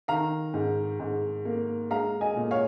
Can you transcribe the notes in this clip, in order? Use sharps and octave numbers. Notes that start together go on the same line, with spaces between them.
D#3 F5 A#5
G#2
G#2
A#3
G#3 F5 A#5
D#5 G#5
A#2
C#5 F5